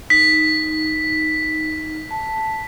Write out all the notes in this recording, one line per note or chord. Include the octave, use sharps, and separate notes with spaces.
D#4 B6
A5